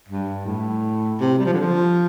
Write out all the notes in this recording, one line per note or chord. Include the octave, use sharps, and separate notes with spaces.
G2
A2
C3
G3
F3
D3
F3